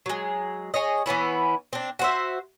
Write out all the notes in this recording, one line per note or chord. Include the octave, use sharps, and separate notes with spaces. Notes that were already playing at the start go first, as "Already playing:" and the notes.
F#3 G#3
G#4 C#5 D#5
E3 B3 C#4 E4
C4 D4
F#4 C5 E5